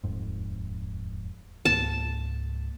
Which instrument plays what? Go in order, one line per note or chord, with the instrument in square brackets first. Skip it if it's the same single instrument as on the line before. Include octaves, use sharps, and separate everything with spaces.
[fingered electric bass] D#1 F2 G#2
[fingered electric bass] C#2 G#2 A#3 [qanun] A5